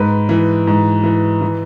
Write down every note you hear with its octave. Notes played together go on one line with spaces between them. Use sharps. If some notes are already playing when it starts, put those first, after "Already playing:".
Already playing: G#2 B4
E3
G#2
E3
E3